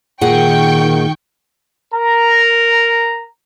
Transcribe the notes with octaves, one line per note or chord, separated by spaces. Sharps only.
A#2 D#3 G#4 F#5 G5 C#6 G6
A#4 A#5